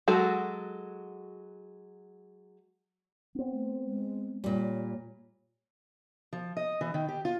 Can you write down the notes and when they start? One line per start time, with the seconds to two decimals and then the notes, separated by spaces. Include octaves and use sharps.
0.08 F#3 G#3 F#4 A4
3.35 B3 C4
3.52 A3
3.86 G#3
4.44 A#2 G3 C#5
6.33 F3
6.57 D#5
6.81 E3
6.94 D#3
7.09 G4
7.25 F4